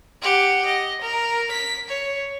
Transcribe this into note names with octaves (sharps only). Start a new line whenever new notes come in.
G4 F#5
D#5
A#4
B6
C#5